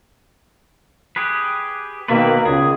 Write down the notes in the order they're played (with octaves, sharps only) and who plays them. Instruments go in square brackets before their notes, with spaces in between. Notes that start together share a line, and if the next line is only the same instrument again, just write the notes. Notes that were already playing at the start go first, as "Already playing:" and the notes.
[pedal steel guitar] G4 G#4 B4
[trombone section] B2 D#3 A#3 [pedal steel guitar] B4 D5 E5
[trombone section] C#2 [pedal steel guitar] G#4